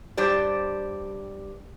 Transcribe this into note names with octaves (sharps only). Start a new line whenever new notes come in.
G2 G4 C5 D5